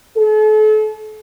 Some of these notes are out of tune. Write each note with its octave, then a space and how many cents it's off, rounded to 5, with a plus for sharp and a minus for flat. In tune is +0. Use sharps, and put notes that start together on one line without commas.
A4 -40